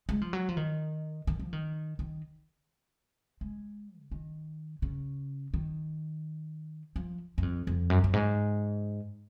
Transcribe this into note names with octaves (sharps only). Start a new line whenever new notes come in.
G#3
F3
F#3
F3
D#3
D#3
F3
D#3
D#3
G#3
C#3
D#3
C#3
D#3
F3
F#2
F2
F2
F#2
F#2
G#2